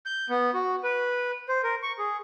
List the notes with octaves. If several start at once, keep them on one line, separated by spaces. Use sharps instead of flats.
G6
B3
F#4
B4
C5
A#4
C#6
G#4